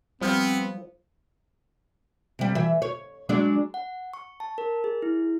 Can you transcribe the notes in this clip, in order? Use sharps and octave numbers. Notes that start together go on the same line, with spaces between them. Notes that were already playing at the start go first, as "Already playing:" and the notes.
F3 G3 B3 C4
C3 G3
E3 E5
C#5
F#3 G#3 D4
F#5
C#6
A5
A#4
G#4
E4